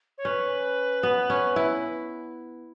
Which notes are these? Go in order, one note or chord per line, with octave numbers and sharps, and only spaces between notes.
C#5
C#4 B4
B3
C#4
E4